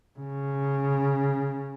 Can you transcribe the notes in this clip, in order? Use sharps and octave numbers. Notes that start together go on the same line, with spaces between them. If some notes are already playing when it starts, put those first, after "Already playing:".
C#3